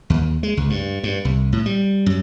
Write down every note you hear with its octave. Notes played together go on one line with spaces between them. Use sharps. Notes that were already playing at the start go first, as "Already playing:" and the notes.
D#2
G#3
C#2
G2
G2
C2
A2
G3
F#2